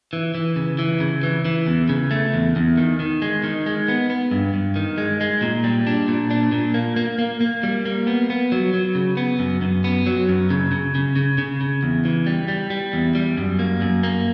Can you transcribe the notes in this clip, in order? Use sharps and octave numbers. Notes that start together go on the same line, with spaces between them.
E3
E3
C#3
E3
C#3
E3
E3
E2
C#3
A3
E2
E2
D#3
D#3
G#3
D#3
G#3
B3
B3
G2
G2
D#3
G#3
G#3
A#2
G3
D4
A#2
D4
A#2
A#3
A#3
A#3
A#3
G3
A#3
B3
B3
F#3
F#3
C#3
B3
F#2
F#2
B3
F#3
F#2
C#3
C#3
C#3
C#3
C#3
C#3
E2
E3
G3
G3
G3
E2
G3
F#2
A#3
F#2
A#3